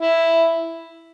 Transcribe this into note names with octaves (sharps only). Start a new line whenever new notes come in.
E4